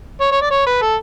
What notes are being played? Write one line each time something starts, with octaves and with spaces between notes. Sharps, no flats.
C#5
C#5
D5
C#5
B4
A4